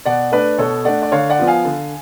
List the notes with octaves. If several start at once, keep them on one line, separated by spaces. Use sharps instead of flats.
B2 D5 F#5
A3 D4 B4 D5
B2 A4 C#5
A3 D4 D5 F#5
D5
D3 C#5 F5
D5 F#5
F3 B3 F4
F5 G#5
D3